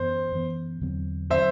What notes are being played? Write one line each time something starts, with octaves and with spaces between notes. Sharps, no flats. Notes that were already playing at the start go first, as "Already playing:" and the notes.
Already playing: F#2 E3 B3 C5
F#2 E3 B3
E2 D3 F#3 C4
D3 F#3 C4 C5 E5